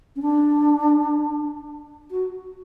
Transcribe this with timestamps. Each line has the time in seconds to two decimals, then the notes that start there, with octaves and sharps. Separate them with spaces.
0.16 C#4
0.22 D4
2.11 F#4